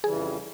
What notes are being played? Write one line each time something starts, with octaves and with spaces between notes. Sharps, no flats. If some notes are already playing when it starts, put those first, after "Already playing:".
F2 C#3 E3 G3 G#4